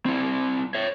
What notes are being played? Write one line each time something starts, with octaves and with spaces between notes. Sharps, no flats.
C4 E4
C#5 E5